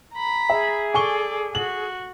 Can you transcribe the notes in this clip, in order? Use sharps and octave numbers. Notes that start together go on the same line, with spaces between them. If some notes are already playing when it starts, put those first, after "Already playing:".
A#5 B5
G#4 E5
A4 D5 G#5 C#6 G7
F#4 F#7